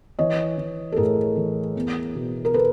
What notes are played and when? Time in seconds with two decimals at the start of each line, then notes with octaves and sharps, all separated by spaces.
0.19 E3 C#5 D#5
0.57 E3
0.92 A4
0.96 A2 G#4 A#4
1.36 E3
1.76 E2
2.15 B2
2.45 A#4
2.54 A4 B4